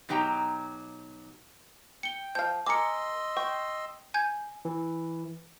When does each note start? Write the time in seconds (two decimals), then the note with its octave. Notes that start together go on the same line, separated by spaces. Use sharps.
0.09 B2 F#3 D#4 G4 G5 A#5
2.03 G5 C#7 G7
2.35 F3 F5 G6
2.66 A#4 D#5 G#5 C6 D6 E6 C#7
3.37 G5 C#6
4.14 G#5 G6 G#6
4.65 E3